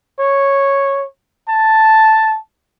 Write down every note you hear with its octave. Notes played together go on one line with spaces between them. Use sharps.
C#5
A5